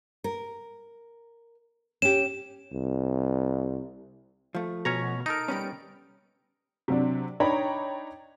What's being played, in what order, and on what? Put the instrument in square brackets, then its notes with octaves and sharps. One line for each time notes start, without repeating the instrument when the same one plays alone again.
[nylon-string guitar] A#4
[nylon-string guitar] C#4 G4 [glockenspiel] E7
[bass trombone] C2
[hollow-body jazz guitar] F3 A3
[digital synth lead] B2 [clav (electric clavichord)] C#4 C#5 A#5
[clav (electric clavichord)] D#4 A4 A#4 [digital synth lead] D7
[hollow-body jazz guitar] G3 B3 C#4
[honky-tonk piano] C3 F#3 D4
D4 D#4 C#5 G5 A#5 B5